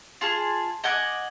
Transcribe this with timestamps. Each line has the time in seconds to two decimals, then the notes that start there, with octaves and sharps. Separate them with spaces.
0.21 F4 G#4 A5
0.84 D#5 F#5 G#5 D6